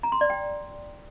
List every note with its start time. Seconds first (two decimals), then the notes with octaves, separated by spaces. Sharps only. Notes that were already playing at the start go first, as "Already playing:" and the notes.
0.03 A#5
0.12 C6
0.21 D5
0.30 G5